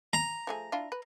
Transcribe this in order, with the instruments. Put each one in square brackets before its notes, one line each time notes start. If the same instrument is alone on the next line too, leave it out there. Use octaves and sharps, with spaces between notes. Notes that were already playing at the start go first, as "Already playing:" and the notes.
[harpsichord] A#5
[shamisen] F3 A3 G#4
D4 E4 F4
B4